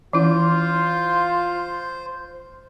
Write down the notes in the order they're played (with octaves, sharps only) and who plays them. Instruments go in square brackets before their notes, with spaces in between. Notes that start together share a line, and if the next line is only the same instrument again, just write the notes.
[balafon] E3 C#4 E4 [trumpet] F4 [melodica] C5